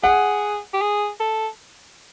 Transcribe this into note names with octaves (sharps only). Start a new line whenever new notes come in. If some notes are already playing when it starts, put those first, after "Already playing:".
G#4 F#5
G4
G#4
A4